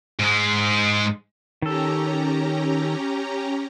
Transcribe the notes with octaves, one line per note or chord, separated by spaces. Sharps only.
G#2 G#3
D#3 C#4 G4 A4 A#5